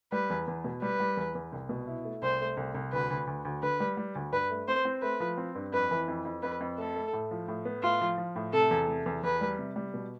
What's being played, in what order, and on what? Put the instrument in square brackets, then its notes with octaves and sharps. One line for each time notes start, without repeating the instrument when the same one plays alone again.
[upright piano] G3 [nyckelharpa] B4
[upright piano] E2
E2
B2
[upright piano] G3 [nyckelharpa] B4
[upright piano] G3
E2
E2
C2
B2
E4
A3
[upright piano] C2 [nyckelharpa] C5
[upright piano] A3
C2
C2
[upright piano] D2 [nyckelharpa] B4
[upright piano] D2
D2
D2
[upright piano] D3 [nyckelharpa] B4
[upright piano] G3
G3
D2
[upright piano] G2 [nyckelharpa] B4
[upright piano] A3
[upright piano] C4 [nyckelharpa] C5
[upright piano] C4
[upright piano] A3 [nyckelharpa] B4
[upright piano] F3
C4
G2
[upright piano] F2 [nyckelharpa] B4
[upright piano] E3
F2
F2
[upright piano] F2 [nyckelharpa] B4
[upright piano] F2
[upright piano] A3 [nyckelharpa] A4
[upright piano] A3
A2
F3
A2
B3
[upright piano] A2 [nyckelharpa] F4
[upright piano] F3
F3
A2
[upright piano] C3 [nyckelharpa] A4
[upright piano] E2
C3
E2
[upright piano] E2 [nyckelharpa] B4
[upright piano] G3
C3
G3
B2